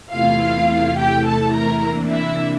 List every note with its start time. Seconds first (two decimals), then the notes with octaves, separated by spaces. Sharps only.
0.11 E2 C3 E3 A3 E4 F4 F5
0.98 G4 G5
1.26 A4 A5
1.54 A#4 A#5
1.83 C3 E3 A#3 D4
2.11 E4 E5